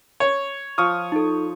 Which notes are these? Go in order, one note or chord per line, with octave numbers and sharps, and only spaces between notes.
C#5
F3 C#6 D#6 F6
D#4 A4